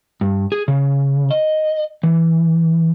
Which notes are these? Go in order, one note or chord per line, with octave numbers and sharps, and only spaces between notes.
G2
G#4
C#3
D#5
E3